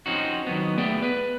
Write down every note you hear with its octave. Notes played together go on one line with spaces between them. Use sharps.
F3 C4 C#4 D#4 F#4
D#3 F#3 B3
A3 B3 G#4 D5 E5 G5
B4